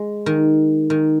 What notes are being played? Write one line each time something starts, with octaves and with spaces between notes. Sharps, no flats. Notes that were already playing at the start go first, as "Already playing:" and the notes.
Already playing: G#3
D#3
D#3